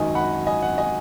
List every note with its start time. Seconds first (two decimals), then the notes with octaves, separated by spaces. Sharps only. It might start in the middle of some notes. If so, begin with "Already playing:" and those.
Already playing: G#1 F#2 D#3 F#3 D#5 G#5
0.15 F#5 B5
0.46 D#5 G#5
0.62 F#5
0.78 D#5 G#5